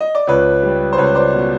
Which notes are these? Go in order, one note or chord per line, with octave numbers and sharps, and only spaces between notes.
D#5
D5
C#2 B4 C#5
G3
C5
C#2 B4 C#5
C5 D5
B2